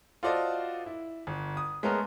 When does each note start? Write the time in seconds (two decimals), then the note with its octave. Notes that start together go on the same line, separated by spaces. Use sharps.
0.23 F4 F#4 A4 C5 D5 D#5
0.86 E4
1.27 G1
1.57 D#6
1.83 G#3 A3 B3 C#4 A#4